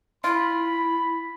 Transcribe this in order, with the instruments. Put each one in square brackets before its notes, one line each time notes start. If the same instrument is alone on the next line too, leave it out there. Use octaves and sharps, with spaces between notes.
[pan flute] E4 [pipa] F4 [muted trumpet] B5